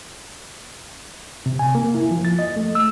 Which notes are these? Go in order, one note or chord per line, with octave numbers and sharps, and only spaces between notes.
C3
G#5
A#3
E4
F3
A6
D#5
A3
E6